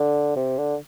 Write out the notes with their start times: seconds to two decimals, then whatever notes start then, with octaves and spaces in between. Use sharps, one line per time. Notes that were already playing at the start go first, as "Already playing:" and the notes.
Already playing: D3
0.36 C3
0.58 D3